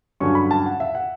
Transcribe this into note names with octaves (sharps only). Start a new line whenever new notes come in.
G2 D3 F#3 C#4 C#6
B5
A5
F#5
E5
F#5